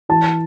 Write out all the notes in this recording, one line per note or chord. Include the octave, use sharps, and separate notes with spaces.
E3 A5